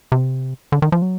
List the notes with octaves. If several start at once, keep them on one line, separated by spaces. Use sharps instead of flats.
C3
D3
D#3
F3
F#3